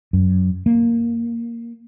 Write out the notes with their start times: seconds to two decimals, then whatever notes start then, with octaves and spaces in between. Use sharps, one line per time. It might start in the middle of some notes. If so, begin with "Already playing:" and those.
0.13 F#2
0.66 A#3